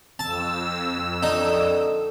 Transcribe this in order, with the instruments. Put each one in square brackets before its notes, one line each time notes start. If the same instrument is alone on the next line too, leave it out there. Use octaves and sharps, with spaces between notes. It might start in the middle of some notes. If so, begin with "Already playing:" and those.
[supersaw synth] F2 E6 [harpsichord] A5
[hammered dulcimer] D3 [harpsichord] D#4